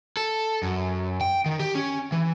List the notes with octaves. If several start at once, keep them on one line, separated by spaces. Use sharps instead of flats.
A4
F#2
G5
D#3
G4
C#4
E3